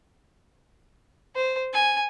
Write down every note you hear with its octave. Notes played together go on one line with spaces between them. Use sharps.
C5
G#5